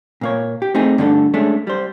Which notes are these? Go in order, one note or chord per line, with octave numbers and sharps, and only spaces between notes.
A#2 A#3 C#5
G4
A3 C4 D#4 G#4
G2 D3 A3 D4 A4
G#3 A3 C#4 D4
G3 C5